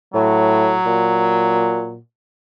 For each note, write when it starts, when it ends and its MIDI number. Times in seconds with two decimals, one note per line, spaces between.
0.14 0.76 45
0.14 1.96 54
0.86 1.99 46